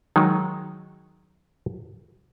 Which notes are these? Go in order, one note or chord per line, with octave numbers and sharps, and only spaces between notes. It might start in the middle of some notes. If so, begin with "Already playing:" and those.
D#3 F#3 G#3 D#4